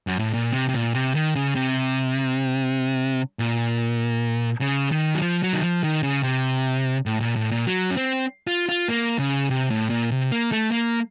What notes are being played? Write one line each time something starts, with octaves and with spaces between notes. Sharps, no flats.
F#2
A2
A#2
C3
C3
A#2
C3
D#3
C#3
C3
A#2
C#3
D#3
F#3
F3
F#3
D#3
F3
D#3
C#3
C3
A2
A#2
A2
A#2
F#3
C#4
C4
F4
F4
A#3
C#3
C3
A2
A#2
C3
A#3
A3
A#3